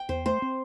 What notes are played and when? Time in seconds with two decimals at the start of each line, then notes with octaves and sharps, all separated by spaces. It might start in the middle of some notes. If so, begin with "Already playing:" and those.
Already playing: G5
0.09 E2 C5
0.26 A3 C5
0.42 C4